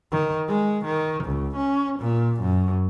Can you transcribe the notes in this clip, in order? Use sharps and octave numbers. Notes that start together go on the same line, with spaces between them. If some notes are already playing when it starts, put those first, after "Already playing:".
D#3
G#3
D#3
C#2
C#4
A#2
F#2